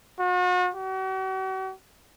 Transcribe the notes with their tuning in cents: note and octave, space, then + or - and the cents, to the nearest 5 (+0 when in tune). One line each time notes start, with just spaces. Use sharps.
F#4 -40
F#4 +45